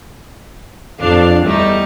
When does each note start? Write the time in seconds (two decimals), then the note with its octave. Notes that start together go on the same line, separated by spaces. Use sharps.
0.99 F2 D4 F5
1.44 E2 G3 A3 D#4